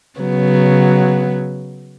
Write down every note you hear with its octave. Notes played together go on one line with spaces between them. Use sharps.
C#3 F#3 B3